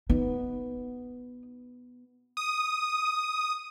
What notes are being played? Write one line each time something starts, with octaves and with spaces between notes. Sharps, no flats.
B3 D#4
D#6